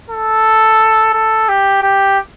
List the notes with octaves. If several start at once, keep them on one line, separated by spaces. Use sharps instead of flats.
A4
A4
G4
G4